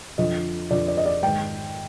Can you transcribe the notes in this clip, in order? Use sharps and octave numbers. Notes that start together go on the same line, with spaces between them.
F2 D3 F3 D#5
F2 D3 F3 D5
D5
D#5
D5
G#2 D#3 G5